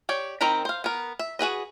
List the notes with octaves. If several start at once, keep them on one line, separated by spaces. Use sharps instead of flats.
G4 C#5 D5
D#3 C4 A#4 A#5 B5
C5 F5
B3 A#4
E5
F#4 G#4 B4 D#5